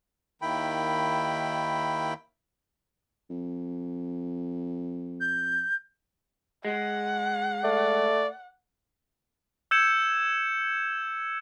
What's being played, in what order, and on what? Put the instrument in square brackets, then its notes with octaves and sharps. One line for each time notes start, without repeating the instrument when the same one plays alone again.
[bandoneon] D#2 D#3 E4 G5 B5
[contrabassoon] F2
[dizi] G6
[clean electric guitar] G#3 [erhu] F#5
[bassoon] A3 [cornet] D5
[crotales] E6 G6 G#6 C#7 E7